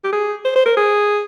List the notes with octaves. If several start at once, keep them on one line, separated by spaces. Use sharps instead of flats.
G4
G#4
C5
C5
A#4
G#4